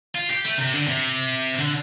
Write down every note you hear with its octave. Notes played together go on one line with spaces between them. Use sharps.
F4
G4
A3
C3
D3
C3
D3